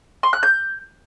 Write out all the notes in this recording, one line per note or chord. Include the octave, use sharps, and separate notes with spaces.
C6
F#6
G6